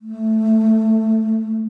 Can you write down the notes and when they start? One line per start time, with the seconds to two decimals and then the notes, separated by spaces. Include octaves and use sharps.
0.02 A3